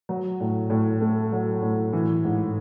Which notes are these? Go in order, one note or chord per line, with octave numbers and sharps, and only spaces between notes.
F#3
A2
A2
A3
F#3
A2
E3
G#2